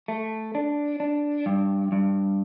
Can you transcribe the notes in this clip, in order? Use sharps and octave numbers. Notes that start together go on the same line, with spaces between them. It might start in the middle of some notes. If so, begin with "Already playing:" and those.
A3
D4
D4
G2
G2